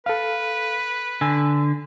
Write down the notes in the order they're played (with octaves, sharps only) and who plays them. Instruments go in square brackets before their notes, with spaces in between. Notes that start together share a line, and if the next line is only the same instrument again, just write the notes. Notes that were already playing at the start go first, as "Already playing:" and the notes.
[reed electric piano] A4 F5 [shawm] B4
[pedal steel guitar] D3 [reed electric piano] G#5 E6